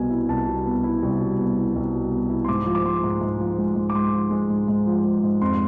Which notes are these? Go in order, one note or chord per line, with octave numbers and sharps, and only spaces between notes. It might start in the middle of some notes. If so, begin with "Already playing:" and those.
Already playing: C2 B2 B3 G#5
E4
C2 A5
B2
B3
E4
C2
B2
B3
E4
C2
B2
B3
E4
C6
G#2 D6
F3
D6
G#3 C6
G#2
G#2
F3
G#3
G#2
D6
G#2 C6
F3
G#3
G#2
G#2
F3
G#3
G#2
F2 C6